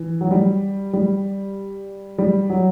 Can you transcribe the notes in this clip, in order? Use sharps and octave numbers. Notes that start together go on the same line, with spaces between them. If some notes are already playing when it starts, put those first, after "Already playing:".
Already playing: E3
F#3
G3
G3
G3
F#3